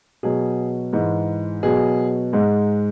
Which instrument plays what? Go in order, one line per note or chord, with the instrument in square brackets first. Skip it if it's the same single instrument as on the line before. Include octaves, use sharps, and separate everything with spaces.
[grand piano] B2 F#3 G#4
G#2 E3 G#3
B2 F#3 G#4
G#2 G#3